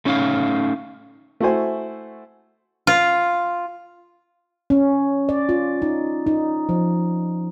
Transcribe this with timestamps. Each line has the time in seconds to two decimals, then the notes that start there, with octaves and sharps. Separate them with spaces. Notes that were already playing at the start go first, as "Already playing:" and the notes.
0.05 A3 C#4 D#4 E5 F5
1.41 A3 E4 F#4 C5 G#5
2.87 F4
4.70 C#4
5.29 D5
5.49 F4
5.82 D#4
6.27 D#4
6.69 F3